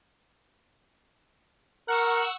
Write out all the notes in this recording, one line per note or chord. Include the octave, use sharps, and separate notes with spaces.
A#4 F#5 C#6 E6